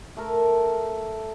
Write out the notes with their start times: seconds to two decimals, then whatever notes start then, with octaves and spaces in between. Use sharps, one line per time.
0.17 A3 A#4